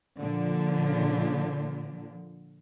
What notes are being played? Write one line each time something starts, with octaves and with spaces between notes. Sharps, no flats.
A#2 D3 F3